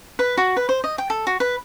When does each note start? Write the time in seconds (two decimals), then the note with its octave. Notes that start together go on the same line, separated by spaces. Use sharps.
0.19 B4
0.37 F#4
0.57 B4
0.69 C5
0.84 D#5
0.98 G5
1.10 A4
1.27 F#4
1.40 B4